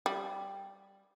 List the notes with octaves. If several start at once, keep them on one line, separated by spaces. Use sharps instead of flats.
G3